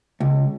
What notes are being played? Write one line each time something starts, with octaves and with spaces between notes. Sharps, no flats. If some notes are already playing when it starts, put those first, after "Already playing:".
C#2